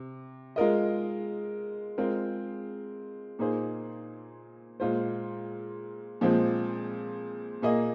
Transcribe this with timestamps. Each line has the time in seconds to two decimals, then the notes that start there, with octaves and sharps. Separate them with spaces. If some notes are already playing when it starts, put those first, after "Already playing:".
Already playing: C3
0.56 G#3 F4 A#4 D#5
1.98 G#3 C4 F4 A#4
3.39 A#2 A#3 D#4 G#4 C5
4.80 A#2 G#3 F4 C5
6.21 A#2 F3 G#3 C4
7.62 A#2 A#3 G#4 D#5